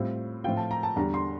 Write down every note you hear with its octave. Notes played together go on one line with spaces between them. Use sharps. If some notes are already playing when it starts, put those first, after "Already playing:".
Already playing: A2 G3 C4 F4
A2 F3 C4 F4 G5
A5
A#5
A5
E2 D3 G3 D4 A#5
C6